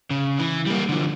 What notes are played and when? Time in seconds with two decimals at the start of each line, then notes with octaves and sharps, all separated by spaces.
0.11 C#3
0.39 E3
0.66 G3 A#3
0.89 D3 F3